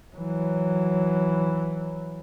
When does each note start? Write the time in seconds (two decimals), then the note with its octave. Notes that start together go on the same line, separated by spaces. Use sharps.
0.16 E3 F#3